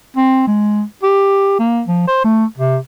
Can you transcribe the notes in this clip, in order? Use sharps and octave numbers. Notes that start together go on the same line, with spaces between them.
C4
G#3
G4
A#3
F3
C5
A3
C3